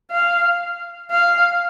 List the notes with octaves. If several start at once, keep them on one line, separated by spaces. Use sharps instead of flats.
F5
F5